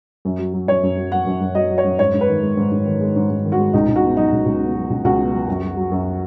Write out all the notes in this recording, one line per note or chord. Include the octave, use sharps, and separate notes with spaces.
F#2
F#3
F#3
F#2 C#5
F#2
F#3
F#3 F#5
F#2
F#2
F#3 D#5
F#3
C#5
F#2
G#2 C#5
G#2
B4
D#3
G#3
G#2
G#2
D#3
G#3
G#2
G#2
D#3
F#4
G#3
C#2 D#4
C#2
F#4
B2
F#3 D#4
C#2
C#2
B2
F#3
C#2
C#2 F#4
B2
F#3
F#2
F#3
F#3
F#2